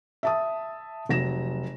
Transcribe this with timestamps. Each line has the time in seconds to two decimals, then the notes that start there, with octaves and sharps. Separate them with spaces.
0.23 E5 A5 D#6
1.09 F1 F#3 A#6 E7